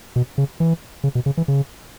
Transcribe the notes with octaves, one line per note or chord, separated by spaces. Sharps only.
B2
C#3
E3
C#3
B2
C#3
E3
C#3